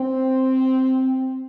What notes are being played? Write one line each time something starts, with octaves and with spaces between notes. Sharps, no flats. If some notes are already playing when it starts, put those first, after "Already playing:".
Already playing: C4